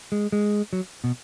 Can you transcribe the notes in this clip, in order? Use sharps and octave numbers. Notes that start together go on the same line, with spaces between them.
G#3
G#3
F#3
B2